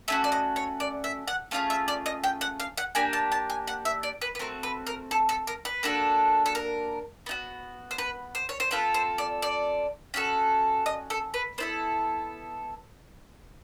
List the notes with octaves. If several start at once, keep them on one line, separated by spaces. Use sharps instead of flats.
A3 C#4 F#4 E5
D5
D#5
C#5
D5
E5
F#5
A3 C#4 F4 G#4 F5
E5
D5
D#5
G5
F#5
F5
F#5
A#3 D4 G4 G#5
A5
A5
G#5
F#5
E5
D5
B4
B4
A3 C4 F#4 A#4
B4
A#4
A4
A4
A#4
B4
A#3 D4 F#4 A4
A4
A#4
B3 D#4 F#4
C5
B4
C5
C#5
C5
C4 F4 A4 B4
C5
D5
D5
C#4 F#4 A4
D#5
A4
B4
B3 E4 A4 C5